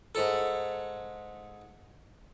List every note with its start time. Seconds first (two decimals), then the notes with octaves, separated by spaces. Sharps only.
0.15 G#2 A4